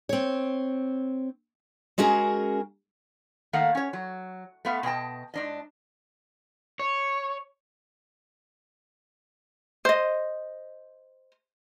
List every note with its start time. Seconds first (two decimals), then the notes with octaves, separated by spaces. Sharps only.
0.09 C4 C#5
1.98 G#3 C#4 F#4 G#4 A#4
3.53 D#3 A3 A#3 F5 F#5
3.75 C#4 C#5
3.93 F#3
4.65 A3 B3 F5
4.83 B2 D#5 G5 A5
5.34 G#2 D4 D#5
6.79 C#5
9.85 C5 D#5